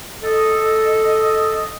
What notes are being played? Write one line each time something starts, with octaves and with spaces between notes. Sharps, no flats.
A4 D#5